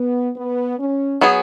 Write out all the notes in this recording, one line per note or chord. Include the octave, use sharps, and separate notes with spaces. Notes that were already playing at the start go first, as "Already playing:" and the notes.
Already playing: B3
B3
C#4
F#3 B3 G#4